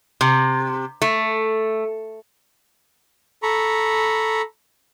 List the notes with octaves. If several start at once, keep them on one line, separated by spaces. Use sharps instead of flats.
C3
A3
A4 A#5 B5 C#6